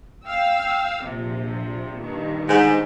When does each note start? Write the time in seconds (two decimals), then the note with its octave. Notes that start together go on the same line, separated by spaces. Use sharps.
0.24 F5 G5 E6
1.04 A#1 C3 F3
2.00 G2 D#3
2.48 G#2